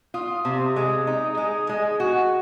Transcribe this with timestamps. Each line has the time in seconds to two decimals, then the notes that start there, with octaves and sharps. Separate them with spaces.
0.14 F4 D#6
0.44 C3 D#6
0.76 G#3
1.07 D#4
1.37 G#3
1.69 G#3
2.00 F#4 G#5